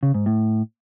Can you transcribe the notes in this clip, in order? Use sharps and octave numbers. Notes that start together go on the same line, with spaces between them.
C#3
G#2
A2